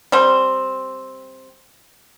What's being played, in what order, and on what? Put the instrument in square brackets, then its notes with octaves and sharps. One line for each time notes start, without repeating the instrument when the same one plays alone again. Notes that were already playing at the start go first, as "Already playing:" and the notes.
[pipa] G3 C4